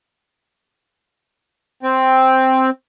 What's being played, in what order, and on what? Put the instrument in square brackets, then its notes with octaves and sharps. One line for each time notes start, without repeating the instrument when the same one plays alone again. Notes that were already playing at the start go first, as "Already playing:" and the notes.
[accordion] C4